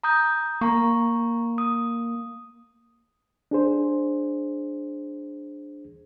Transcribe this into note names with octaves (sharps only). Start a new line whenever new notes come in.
A#5 D#6 G6
A#3 A#5 C#6
D#6
D4 G#4 C5